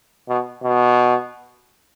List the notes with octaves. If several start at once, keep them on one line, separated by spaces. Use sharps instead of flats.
B2
B2